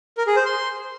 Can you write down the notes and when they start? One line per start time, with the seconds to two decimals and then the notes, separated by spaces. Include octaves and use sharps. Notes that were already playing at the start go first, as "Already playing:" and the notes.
0.17 A#4
0.27 G#4
0.36 C5
0.46 C6